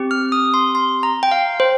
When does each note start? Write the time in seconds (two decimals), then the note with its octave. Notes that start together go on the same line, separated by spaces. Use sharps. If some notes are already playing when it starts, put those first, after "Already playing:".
Already playing: C4 G4
0.11 F6
0.32 D#6
0.54 C6
0.75 C6
1.03 A#5
1.23 G5
1.32 F5
1.60 C5